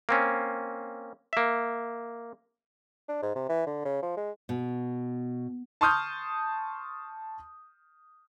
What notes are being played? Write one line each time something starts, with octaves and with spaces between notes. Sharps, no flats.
A#3 C4 C#4
A#3 E5
D4
G#2
C3
E3
D3
C#3
F3
G#3
B2
A5 C6 C#6 D#6 F6 G6